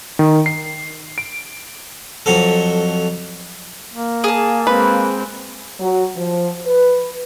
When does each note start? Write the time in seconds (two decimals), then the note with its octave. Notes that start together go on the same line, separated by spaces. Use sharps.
0.19 D#3
0.46 C7
1.18 D7
2.26 F2 F#3 A4
3.94 A#3
4.24 G#4 A5
4.67 G#3 C4 B4
5.79 F#3
6.16 F3
6.65 B4